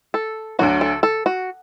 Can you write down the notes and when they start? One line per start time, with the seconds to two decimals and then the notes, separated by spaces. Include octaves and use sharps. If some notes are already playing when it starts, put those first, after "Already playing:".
0.14 A4
0.59 D2 D3 F#3 F#4
0.81 A4
1.03 A4
1.26 F#4